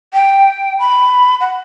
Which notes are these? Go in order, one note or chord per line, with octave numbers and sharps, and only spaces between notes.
G5
B5
F#5